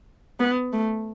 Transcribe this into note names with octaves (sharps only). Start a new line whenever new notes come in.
B3
A3